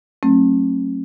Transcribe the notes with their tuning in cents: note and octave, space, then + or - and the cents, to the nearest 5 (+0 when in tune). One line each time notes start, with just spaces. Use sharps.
F#3 +0 A3 +15 C#4 -45